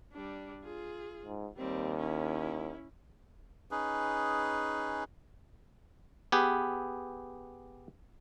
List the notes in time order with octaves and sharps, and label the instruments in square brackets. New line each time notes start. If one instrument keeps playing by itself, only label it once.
[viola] G3 D4
F4 G#4
[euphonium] G#2
[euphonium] D#2 [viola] G3 C4
[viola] C#4 E4
[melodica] C#4 D#4 G#4 B4
[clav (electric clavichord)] B3 G4 G#4 B4